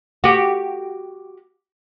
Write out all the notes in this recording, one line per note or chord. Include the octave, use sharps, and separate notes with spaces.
F#4 G4